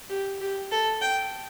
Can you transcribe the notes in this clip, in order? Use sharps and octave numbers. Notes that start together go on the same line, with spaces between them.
G4
G4
A4
G5